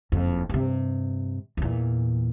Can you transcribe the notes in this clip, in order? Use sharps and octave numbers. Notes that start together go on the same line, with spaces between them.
F#1 F2
G2 C3
E2 A#2